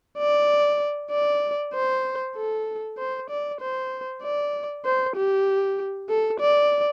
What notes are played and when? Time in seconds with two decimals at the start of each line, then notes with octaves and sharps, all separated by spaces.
0.18 D5
1.11 D5
1.74 C5
2.36 A4
2.98 C5
3.30 D5
3.61 C5
4.22 D5
4.85 C5
5.16 G4
6.09 A4
6.40 D5